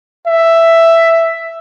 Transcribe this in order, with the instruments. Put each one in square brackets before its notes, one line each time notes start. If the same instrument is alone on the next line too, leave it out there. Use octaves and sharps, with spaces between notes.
[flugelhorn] E5